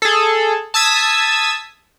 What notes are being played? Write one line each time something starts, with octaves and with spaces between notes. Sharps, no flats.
G#4 A4
A5 D#6 E6 G#6 B6